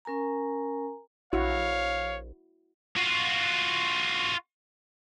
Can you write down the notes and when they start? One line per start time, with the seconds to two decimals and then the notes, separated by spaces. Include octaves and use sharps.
0.05 C#4 A#4 G#5 A#5
1.33 A#1 E4 F#4 C#5 F5
2.97 F4 F#4